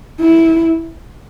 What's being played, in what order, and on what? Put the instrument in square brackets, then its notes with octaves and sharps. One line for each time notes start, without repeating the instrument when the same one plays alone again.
[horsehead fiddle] E4